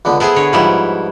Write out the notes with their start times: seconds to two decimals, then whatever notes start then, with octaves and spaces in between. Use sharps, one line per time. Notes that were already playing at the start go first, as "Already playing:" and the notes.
0.05 C#2 D3 B3
0.20 B3 E4 G#4 A4 C5 G#5
0.36 D3 C#5
0.53 G#2 F3 G3 B3 E4